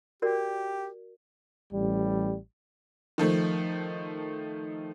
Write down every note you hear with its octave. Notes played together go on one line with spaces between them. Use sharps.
F#4 G4 A#4 D5
A1 G3
D#3 F3 A3